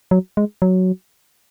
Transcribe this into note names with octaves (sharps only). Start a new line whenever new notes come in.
F#3
G#3
F#3